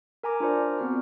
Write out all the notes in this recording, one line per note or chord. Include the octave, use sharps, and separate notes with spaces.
A#4 G#5 A#5 D6
D4 F4 A#4 C5 D5
B3 C4 F#4 F6